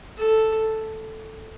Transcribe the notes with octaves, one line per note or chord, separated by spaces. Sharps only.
A4